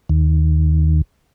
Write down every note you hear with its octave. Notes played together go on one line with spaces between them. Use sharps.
D#2